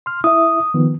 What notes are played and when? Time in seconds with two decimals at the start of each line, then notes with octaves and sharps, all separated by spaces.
0.06 C6 F6
0.24 E4 E5 D#6
0.74 D#3 F3 B3